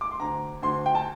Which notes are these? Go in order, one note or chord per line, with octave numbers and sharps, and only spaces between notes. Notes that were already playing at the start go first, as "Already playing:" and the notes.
D6
C6
D2 A#5
D2 C6
G5
A5